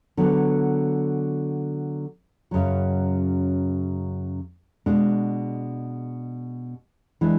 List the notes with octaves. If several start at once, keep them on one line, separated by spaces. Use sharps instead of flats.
D3 F#3 B3
F#2 C#3 F#3
B2 G#3 D4
E3 G#3 D4